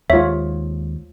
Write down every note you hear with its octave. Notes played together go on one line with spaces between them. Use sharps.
D#2 G#3 F4 C#5 E5